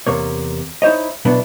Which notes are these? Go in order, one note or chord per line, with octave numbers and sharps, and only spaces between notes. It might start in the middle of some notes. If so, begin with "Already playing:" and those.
E2 C3 A#3 C#5
D#4 E4 C5 C#5 D#5
B1 B2 B3 D4 E4